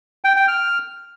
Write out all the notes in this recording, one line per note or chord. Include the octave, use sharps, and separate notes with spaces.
G5
G5
F6